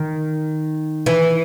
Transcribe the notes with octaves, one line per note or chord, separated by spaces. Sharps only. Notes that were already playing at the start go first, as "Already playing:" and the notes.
Already playing: D#3
E3